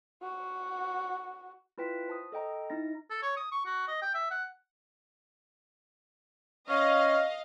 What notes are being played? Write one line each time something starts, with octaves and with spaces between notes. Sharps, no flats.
F#4
E4 F4 B4 G5 B6
C5 A5 D#6
A4 D#5 G5 A#5
D#4 E4 A6 A#6
A4
C#5
D#6
C#6
F#4
D#5
G5
E5
F#5
C#4 D#5 F5